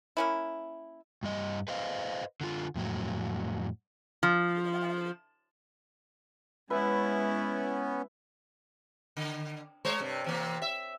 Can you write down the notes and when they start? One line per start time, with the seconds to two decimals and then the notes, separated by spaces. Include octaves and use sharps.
0.17 A#3 C#4 E4
1.23 G2 G3 D#5
1.68 B4 C5 D#5 F5
2.41 D3 F4
2.75 F2 A2 F#3
4.23 F3
6.70 G#3 B3 C#4 E4 B4 E5
9.17 D3
9.85 G#3 C5 C#5
10.00 G2 C3
10.24 C3 E3 A#3
10.62 E5